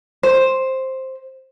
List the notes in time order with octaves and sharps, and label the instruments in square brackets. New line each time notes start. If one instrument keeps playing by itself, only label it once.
[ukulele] C5